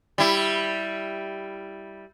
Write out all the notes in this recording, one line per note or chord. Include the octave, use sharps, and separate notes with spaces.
G3 E4